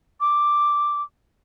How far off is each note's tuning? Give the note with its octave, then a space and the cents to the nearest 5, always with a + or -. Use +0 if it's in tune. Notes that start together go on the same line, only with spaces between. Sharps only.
D6 +0